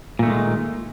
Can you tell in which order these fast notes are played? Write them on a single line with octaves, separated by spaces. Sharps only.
A#2 A3 D#3 G#3